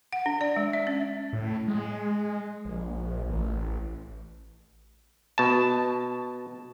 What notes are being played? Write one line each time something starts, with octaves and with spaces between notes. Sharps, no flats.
F#5
D4
D5
G#3
E5
C#4
A2
G#3
A#1
A1
B2 A5